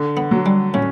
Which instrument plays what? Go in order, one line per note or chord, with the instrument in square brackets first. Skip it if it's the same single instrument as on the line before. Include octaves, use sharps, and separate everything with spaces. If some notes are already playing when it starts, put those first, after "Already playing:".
Already playing: [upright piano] D3
[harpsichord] B3
[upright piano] F#3
[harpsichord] G3
[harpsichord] A2 [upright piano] C#4